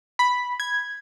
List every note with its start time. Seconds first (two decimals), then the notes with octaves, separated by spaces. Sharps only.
0.19 B5
0.60 G#6